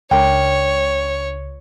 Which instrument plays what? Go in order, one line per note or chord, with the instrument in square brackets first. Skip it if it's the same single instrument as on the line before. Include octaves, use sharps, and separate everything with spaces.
[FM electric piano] C#2 [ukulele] D4 A#4 G5 [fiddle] C#5